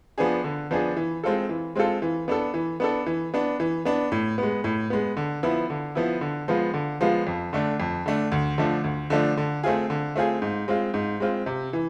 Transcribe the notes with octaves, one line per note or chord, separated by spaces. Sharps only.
F3 B3 D4 G#4
D3
F3 B3 D4 G#4
E3
G#3 C4 F4 A4
E3
G#3 C4 F4 A4
E3
B3 D4 A4
E3
B3 D4 A4
E3
B3 D4
E3
B3 D4
A2
G#3 B3
A2
G#3 B3
D3
F3 B3 E4
D3
F3 B3 E4
D3
F3 G#3 B3 F4
D3
F3 G#3 B3 F4
F2
D3 A3 D4
F2
D3 A3 D4
D2
D3 F3 A3 D4
D2
D3 F3 A3 D4
D3
A3 C4 F4 G#4
D3
A3 C4 F4 G#4
G#2
G#3 C4 F4
G#2
G#3 C4 F4
C3
E3